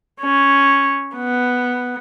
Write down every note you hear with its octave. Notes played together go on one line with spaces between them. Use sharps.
C#4
B3